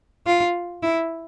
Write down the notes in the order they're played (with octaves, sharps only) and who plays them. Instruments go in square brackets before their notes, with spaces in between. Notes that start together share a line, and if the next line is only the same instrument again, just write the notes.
[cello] F4
E4